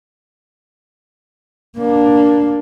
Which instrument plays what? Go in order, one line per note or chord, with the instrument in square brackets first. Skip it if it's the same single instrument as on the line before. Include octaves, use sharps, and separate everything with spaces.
[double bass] A#3 D4